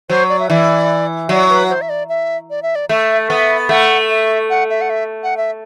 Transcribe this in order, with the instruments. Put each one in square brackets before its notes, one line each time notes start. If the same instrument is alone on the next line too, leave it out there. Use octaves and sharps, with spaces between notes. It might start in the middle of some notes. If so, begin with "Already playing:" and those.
[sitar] F#3 [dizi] C5
[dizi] D5
E5
[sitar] E3 [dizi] D5
[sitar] F#3 [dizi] D5
[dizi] B4
C5
E5
D5
E5
D5
E5
D5
[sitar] A3 [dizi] E5
[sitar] B3 [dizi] E5
[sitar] A3 [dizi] F#5
[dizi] E5
F#5
E5
F#5
E5
F#5
E5